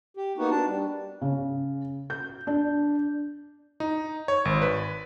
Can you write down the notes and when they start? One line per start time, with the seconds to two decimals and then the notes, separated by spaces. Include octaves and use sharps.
0.17 G4
0.38 A#3 B3 D#4 F#4
0.51 D4 A5
0.67 G3
1.21 C#3
2.10 G6
2.47 D4
3.80 D#4
4.28 C#5
4.45 G#1
4.62 B4